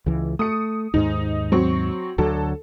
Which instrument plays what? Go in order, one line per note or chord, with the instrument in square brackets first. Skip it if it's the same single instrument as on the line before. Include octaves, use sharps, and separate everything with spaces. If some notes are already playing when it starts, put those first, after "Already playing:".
[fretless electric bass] C#2 E3
[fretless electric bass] A3 [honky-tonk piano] D#6 C#7
[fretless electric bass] D#2 G#2 [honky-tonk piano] D#4
[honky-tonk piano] F#3 C4 C#6
[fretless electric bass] D2 D3 F#3 [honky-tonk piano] A4